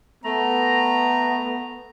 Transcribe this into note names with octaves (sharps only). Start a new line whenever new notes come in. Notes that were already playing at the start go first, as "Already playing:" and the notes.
A3 B3 A#5